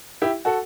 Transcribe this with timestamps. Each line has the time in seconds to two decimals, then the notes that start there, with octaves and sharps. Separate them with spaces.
0.22 E4 G4
0.45 F#4 A4